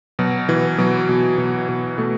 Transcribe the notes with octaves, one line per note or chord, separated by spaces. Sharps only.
B2 F#3
B2 E3
B2 F#3
B2
B2
B2
B2 A3